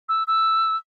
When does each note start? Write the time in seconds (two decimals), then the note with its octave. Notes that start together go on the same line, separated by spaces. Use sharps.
0.09 E6
0.27 E6